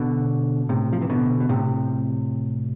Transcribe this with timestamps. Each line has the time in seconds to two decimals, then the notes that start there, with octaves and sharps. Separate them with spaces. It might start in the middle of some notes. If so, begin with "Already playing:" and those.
Already playing: B2 D3
0.69 A2 C3
0.93 F3
1.01 E3
1.10 B2 D3
1.40 B2
1.49 A2 C3